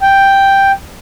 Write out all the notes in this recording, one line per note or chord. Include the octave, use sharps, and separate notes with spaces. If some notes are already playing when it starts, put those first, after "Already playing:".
G5